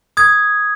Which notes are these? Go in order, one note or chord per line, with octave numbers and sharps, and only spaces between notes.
D#6 G#6